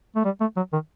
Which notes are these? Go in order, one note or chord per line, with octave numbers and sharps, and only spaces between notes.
A3
G3
A3
F#3
D#3